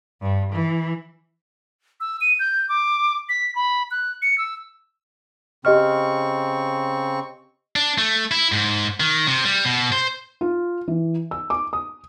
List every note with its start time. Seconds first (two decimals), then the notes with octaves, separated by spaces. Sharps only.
0.22 G2
0.53 E3
2.00 E6
2.21 D#7
2.39 G6
2.69 D6
3.29 B6
3.55 B5
3.91 F#6
4.22 C#7
4.38 E6
5.65 C#3 C4 G4 D#5 C#6 F6
7.76 D4
7.98 A3
8.31 E4
8.52 G#2
9.00 D#3
9.27 C3
9.45 G3
9.65 B2
9.92 C5
10.41 F4
10.88 E3
11.31 E6
11.50 D6
11.73 D#6